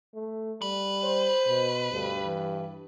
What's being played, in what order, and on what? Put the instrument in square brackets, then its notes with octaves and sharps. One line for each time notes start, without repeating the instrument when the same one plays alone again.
[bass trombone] A3
[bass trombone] G3 [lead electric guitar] B4
[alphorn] C5
[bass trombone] B2
[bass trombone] D2 [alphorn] G2
[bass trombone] E3